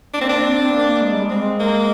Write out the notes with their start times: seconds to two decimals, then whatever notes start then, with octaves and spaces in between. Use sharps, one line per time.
0.13 A#3 D4
0.21 C4
0.29 D4
0.42 C4
0.59 C4
0.72 A#3
1.02 G#3
1.13 G3
1.24 G#3
1.31 C4
1.60 A#3